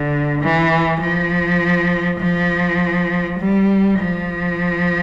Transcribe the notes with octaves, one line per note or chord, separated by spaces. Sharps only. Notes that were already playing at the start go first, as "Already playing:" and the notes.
Already playing: D3
E3
F3
F3
G3
F3